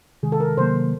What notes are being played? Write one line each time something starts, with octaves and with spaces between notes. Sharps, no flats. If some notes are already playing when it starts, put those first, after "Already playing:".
C3 D#3 G#3 G#4
A4
A#4
C3 D#3 F#3 A#3 C5